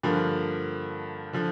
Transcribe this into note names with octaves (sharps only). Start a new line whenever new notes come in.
G2 D3 F3 A#3
D3 F3